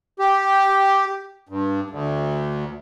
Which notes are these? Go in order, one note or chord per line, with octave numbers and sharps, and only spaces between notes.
G4
G2
D2